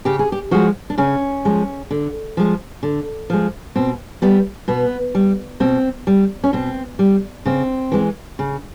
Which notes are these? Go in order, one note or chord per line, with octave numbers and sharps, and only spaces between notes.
C#3 G4
G#4
G4
F3 G#3 F#4
D4
C#3 C#4
F3 G#3
D3
F3 G#3
D3
F3 G#3
B2 C4
G3 B3
B2 B3
G3
B2 C4
G3
C#4
B2 C4
G3
C#3 C4
E3 G#3
C#3